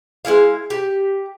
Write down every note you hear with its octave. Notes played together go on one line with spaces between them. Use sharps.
G#3 C#4 E4 F5
G4